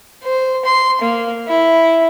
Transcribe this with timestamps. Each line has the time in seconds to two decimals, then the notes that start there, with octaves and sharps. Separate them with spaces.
0.23 C5
0.65 C6
1.01 A#3
1.48 E4